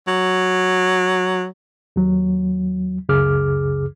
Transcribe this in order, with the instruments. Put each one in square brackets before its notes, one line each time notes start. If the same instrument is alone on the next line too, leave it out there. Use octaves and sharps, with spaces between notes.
[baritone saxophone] F#3
[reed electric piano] D#2 F#3
C#2 F#2 C#3 G#4 D6 F6